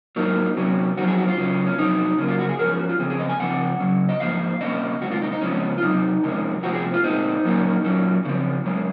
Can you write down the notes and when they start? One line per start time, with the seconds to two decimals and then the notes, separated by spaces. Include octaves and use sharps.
0.16 G#2 F#3 A#3 D#4
0.57 C3 F#3 C#4
0.97 F2 D#3 F#3 C4 F#4
1.08 G#4
1.18 F#4
1.28 F4
1.37 C#3 F#3 C#4
1.66 C#4
1.78 F2 C3 F#3 C4 D#4
2.18 C#3 F#3 A#3 C#4
2.28 F4
2.39 F#4
2.49 G#4
2.59 G#2 F3 C#4 A#4
2.69 G#4
2.79 F#4
2.89 F4
2.99 C#3 F3 C4 G#4
3.10 G#4
3.19 D#5
3.29 G#5
3.40 C#3 F3 C4 F#5
3.80 C#3 F#3 C#4
4.09 D#5
4.20 G#2 F3 A#3 F5
4.61 C3 D#3 A#3 C#4 D#5
5.01 C3 D#3 G#3 F#4
5.11 F4
5.21 D#4
5.32 D#4
5.41 C#3 F3 G#3 C4 C#4
5.78 F4
5.82 C3 F#3 C4 D#4
6.23 F2 C3 D#3 G#3 C#4
6.63 C3 F3 C4 F#4
6.73 G#4
6.94 F4
7.04 A#2 G#3 C4 D#4
7.44 A#2 F#3 A#3 C#4
7.84 A#2 F#3 C#4
8.25 C#3 C#4
8.28 F3 C4
8.65 F#2 D#3 G#3 C#4